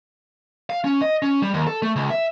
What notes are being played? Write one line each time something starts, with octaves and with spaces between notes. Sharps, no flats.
F5
C#4
D#5
C#4
G3
D#2
A4
A3
C#2
E5